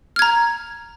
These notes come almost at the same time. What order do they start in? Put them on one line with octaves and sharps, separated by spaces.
F6 G#6 A#5